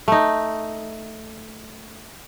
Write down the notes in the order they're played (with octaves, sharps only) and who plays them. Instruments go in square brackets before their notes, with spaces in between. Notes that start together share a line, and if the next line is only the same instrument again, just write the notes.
[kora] A3 D#4